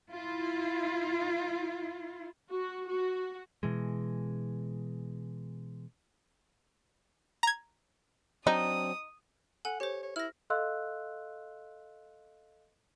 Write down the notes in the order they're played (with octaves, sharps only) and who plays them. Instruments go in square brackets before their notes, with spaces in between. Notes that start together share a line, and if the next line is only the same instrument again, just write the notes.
[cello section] E4 F4
[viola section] F#4
F#4
[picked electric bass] B2 E3 G#3
[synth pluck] A#5 G#6
[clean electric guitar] F#3 C4 D4 [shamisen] D#4 [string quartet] D#6
[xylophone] A4 G#5 [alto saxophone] F#5
[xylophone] G4 C5 [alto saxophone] C#5
[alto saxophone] C#5
[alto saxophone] E4 [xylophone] F6 A#6
[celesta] A4 D#5 F5 C6 E6 F#6